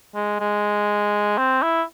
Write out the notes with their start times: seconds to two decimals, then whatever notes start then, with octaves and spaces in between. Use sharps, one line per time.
0.15 G#3
0.40 G#3
1.38 C4
1.63 E4